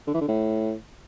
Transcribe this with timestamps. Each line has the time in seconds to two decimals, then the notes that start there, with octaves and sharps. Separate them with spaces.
0.07 D3
0.14 E3
0.21 D3
0.28 A2